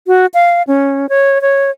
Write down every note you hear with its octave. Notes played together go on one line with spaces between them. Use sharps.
F#4
F5
C#4
C#5
C#5